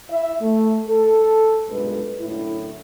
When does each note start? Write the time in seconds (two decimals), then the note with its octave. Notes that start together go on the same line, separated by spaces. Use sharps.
0.10 E4 E5
0.41 A3
0.89 A4
1.68 B1 G2 A#2 G#3 A4 B4
2.20 F#2 A2 D3 E4